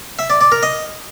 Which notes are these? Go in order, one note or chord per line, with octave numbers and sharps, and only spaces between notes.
E5
D5
D5
A#4
D#5